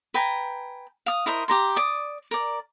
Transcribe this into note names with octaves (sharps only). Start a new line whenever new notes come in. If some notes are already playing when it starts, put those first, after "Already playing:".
B4 G5 G#5 A#5
F5 D#6
E4 A#4 C5 D#5
G4 A#5 C6
D5 D#6
A#4 D5